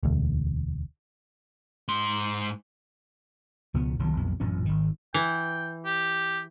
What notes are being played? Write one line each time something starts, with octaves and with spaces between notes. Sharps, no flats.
E1 D2
G#2 C6
C#2 B2 F3 B3
D#1 C2 D#3 F#3
B1 F2 A#2
A1 F#2 A#2 C#4
G#1 D#3
E3 G5
G4